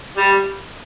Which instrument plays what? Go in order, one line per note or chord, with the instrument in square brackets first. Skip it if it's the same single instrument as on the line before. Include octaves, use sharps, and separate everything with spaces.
[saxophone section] G3